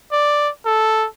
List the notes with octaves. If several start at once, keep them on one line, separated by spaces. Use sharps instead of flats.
D5
A4